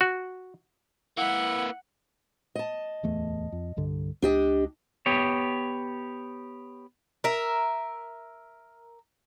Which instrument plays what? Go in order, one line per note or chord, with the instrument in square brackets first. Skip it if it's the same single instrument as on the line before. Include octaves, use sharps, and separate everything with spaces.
[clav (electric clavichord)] F#4
[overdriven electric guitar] A#3 B4 [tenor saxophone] E4 [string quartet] F#5
[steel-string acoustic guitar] D#5 A5
[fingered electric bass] D1 E2 A3
F2
C2 G2 D3
[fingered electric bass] C#2 [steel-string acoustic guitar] D4 G4 D#5
[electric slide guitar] B3 G4 C#5
[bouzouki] A#4 E5